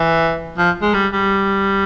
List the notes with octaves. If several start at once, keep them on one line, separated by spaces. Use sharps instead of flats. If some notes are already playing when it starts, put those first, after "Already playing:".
Already playing: E3
F3
G#3
G3
G3